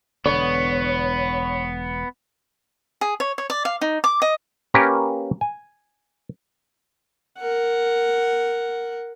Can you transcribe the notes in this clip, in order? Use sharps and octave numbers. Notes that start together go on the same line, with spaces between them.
E1 D3 B3 C#5
G#4
C#5
C#5
D5
F5
D#4
D6
D#5
A#3 C#4 G4 A#4 B4
G#5
A#4 F#5